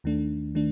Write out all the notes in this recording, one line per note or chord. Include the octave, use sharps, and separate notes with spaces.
D#2 D#3 A3 D4
D#3 A3 D4